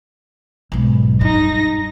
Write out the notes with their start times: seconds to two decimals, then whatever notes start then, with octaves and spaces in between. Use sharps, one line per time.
0.72 B1 G#2
1.21 G2 D#4 A#6